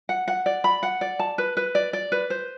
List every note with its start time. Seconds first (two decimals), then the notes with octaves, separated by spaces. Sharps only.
0.09 F#5
0.28 F#5
0.46 D5
0.64 B5
0.83 F#5
1.01 D5
1.19 A5
1.38 B4
1.57 B4
1.75 D5
1.93 D5
2.12 B4
2.30 C5